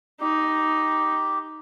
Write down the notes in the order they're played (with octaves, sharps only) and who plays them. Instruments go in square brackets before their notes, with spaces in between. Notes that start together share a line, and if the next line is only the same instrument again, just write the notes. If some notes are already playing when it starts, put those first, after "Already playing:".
[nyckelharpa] D#4 [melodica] G4